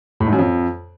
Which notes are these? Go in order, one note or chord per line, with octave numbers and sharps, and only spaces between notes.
A2
G#2
F#2
F2